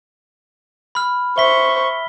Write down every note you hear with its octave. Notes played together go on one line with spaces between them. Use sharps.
B5 F6
C5 E5 C#6 B6 G7